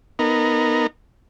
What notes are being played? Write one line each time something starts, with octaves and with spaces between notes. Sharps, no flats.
B3 D#4 A#4